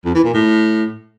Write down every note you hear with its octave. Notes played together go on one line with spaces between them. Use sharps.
F2
E3
A#2
A2